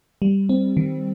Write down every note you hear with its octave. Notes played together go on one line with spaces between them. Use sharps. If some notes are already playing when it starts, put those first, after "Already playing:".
G3
C4
D#3